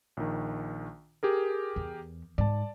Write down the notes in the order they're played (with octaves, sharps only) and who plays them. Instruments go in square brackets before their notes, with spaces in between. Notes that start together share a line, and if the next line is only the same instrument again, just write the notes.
[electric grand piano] A#1 D#3
G4 G#4 A#4
[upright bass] E2
[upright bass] G#2 [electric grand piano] D5 A5